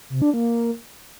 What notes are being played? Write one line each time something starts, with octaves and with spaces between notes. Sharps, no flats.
C3
D4
A#3